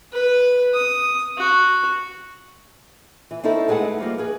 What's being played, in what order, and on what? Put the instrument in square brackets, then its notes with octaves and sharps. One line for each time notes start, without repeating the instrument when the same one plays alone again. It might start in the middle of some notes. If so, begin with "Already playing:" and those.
[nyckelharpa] B4
D#6
F#4
[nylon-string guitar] E3
C4 C#4 D#4 E4 A4
G#3 A3 G#4 B4 F#5
F3 G3 A#3
G#4 B4